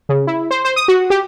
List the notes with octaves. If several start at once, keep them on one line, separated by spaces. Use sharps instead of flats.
C#3
E4
C5
C5
D#6
F#4
G4